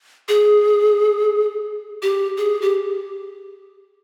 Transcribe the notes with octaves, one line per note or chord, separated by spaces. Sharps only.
G#4
G4
G#4
G4